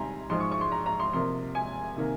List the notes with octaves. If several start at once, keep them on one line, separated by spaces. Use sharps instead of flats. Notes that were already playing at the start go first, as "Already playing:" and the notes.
Already playing: C3 D#3 G3 G#5 A#5 C6
G#2 F3 G#3 C6
C#6
C#6
C6
A#5
A#5
C6
C3 F3 A#3 C6
G#5
C3 D#3 A#3